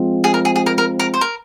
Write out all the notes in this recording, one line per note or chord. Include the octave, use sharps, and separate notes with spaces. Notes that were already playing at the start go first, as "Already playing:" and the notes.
Already playing: F3 G#3 C4 F4
G#4
A#4
G#4
G#4
A#4
A#4
A#4
C5
A#4